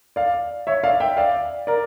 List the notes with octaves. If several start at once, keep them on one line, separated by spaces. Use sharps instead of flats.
D5 F5
C#5 E5
D5 F5
E5 G5
D5 F5
A#4 D5